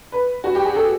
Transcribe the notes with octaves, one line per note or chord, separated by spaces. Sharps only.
B4
F#4
G4
G#4
A4